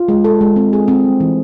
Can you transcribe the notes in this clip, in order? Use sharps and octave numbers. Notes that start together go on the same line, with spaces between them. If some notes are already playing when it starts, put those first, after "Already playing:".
Already playing: F4
G#3
A4
G#3
C4
G#4
C4
G3
E3